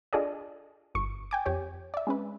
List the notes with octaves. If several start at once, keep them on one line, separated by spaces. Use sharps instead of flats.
D4 F4 G#4 A4 D5 D#5
G1 C#6
G5 G#5 D6
F2 G4 C#5
D5 E5
G#3 C#4 B4